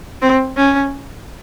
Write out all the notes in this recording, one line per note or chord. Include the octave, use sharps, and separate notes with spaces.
C4
C#4